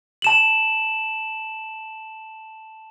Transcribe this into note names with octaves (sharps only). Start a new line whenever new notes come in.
A5 E7 F#7